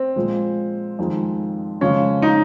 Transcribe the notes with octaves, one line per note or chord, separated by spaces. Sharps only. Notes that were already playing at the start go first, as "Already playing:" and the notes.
Already playing: C4
A#2 F3 G#3
F2 D#3 G#3
F2 C#3 G#3 C#4
D#4